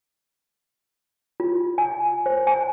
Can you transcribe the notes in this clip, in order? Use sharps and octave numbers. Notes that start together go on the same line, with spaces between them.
F4
G#5
C5
G#5